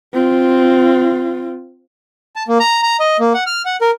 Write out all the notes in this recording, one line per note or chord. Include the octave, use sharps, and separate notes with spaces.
C4 F4
A5
A#3
A#5
A#5
D#5
A#3
F#5
F6
F#5
A#4